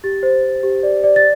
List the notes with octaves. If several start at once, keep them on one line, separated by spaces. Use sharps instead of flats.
G4 A6
C5
C5
G4
D5
D5
A6